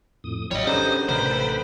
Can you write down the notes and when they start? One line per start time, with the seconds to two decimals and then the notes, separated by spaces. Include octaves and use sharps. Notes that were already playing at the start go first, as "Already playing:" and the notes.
0.24 F2 A2 D#6
0.51 A1 F#3 G3 C#5 D#5
0.67 D3 B3 C#4 D#4 G4 G#4 C5 D#5
1.09 A1 C3 A#3 B3 B4 C5 G5 B5
1.31 A4